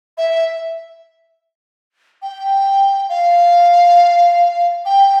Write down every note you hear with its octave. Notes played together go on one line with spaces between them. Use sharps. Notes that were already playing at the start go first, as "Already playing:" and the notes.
E5
G5
F5
G5